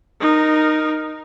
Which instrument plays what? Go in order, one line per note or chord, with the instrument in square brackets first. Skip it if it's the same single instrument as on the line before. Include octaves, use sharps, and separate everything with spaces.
[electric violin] D#4 A#4